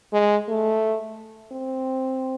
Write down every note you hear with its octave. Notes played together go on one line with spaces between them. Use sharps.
G#3
A3
C4